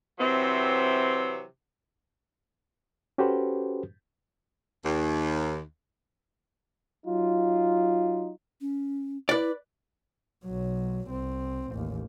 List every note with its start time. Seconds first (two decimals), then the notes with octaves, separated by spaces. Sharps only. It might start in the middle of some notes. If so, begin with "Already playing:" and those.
0.19 C3 E3 F#3 C4
3.18 C#4 F#4 G4 A4 B4 C5
4.84 D#2
7.04 F#3 D#4 F4
8.61 C#4
9.29 E4 B4 D5
10.45 B1 F#3
11.08 C2 C4
11.71 A1 D#2